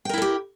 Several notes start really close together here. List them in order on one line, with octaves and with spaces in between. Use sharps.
G5 A#4 E4 A4 G4